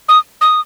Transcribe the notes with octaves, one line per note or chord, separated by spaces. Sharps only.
D#6
D#6